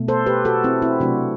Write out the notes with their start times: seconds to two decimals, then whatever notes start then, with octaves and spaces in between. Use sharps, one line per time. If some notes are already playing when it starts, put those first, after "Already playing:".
Already playing: B2 A3
0.08 A4 C5
0.26 G4 B4
0.45 F#4 A4
0.64 C4 E4
0.82 C4 E4
1.00 C3 F#3 A3 D4 F#4